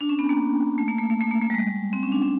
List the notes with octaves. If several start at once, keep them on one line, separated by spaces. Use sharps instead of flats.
D4
C#4
B3
A#3
A3
A#3
A3
A#3
A3
A#3
A3
G3
G#3
C4
C#4
D4
C#4